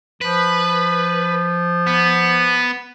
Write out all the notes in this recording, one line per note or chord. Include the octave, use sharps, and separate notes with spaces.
F3 B4
B3